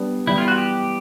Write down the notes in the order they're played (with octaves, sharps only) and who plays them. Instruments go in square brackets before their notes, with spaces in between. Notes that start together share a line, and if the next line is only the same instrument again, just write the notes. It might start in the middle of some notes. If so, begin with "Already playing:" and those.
Already playing: [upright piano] G3 B3 D4
[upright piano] E3 G3 B3 [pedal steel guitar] E4
[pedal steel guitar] F4
F#4
G4